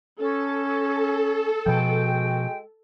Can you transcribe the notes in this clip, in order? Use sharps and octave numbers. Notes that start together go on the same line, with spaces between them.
C#4 A4
B2 F3 G#3 F#4 G5